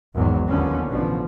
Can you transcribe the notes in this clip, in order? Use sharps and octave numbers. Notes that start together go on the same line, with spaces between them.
G#1 E2 F#3
D#2 D3 F3 B3 C#4
A1 B2 D3 F3